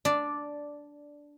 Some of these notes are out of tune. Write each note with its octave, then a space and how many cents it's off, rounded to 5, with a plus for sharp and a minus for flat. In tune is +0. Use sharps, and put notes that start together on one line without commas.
D4 -5 D5 +0